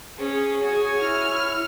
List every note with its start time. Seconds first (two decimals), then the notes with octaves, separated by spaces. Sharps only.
0.18 C#4 G#4
0.63 F#4 C#5 G#5
1.00 E4 F6